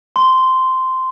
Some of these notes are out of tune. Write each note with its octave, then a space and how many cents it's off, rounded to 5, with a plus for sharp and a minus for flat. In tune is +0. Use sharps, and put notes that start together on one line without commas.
C6 -10